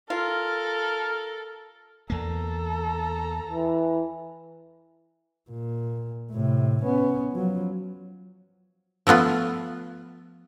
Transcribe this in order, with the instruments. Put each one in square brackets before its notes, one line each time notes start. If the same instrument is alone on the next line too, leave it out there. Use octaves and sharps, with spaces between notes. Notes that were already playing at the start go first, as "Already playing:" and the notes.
[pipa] F4 [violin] A4 [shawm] A#4
[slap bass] E2 A#3 [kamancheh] A4 A#5
[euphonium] E3
[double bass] A#2
A2 C3
B3 C#4
F3 F#3
[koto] F3 A3 B3 F4